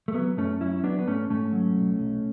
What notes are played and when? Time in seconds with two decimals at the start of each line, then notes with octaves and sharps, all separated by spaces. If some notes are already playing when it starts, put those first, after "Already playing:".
0.08 A3
0.14 F#3 B3
0.38 F#2 A3 C#4
0.61 F#3 C#4 E4
0.84 F#3 B3 D4
0.99 B3
1.07 G#2 A3 C#4
1.30 G#2 A3 C#4
1.53 F#3
1.76 B1
1.99 B1